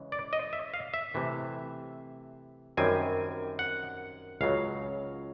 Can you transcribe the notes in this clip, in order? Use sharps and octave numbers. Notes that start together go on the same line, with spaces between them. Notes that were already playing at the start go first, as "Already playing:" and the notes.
Already playing: C#3 E3 G#3
D5
D#5
E5
F5
E5
C3 E3 A3
F#2 D#3 G3 C4 G#5
F#5
C#2 C#3 F#3 F5